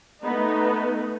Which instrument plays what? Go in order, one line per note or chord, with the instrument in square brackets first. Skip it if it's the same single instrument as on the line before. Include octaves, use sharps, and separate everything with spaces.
[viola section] A3 B3 D#4